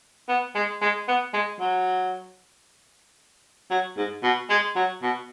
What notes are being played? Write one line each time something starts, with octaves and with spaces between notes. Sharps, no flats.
B3
G#3
G#3
B3
G#3
F#3
F#3
G#2
B2
G#3
F#3
B2